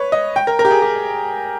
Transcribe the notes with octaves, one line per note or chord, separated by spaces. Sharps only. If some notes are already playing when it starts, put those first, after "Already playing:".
Already playing: B4 C#5
D#5
G5
A#4
A#4
G4
G#4
G4